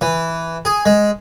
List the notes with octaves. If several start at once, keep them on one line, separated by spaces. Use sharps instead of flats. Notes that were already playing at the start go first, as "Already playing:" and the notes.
E3
G#4
G#3